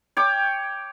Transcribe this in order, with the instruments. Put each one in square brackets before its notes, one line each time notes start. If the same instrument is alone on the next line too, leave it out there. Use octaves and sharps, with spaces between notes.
[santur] C#5 G5 D6